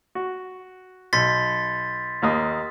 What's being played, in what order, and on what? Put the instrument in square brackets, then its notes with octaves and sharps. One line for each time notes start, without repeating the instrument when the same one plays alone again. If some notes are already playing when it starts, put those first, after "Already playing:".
[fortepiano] F#4
[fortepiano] B1 [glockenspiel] C6 A6 B6
[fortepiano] D#2 A#3 D#6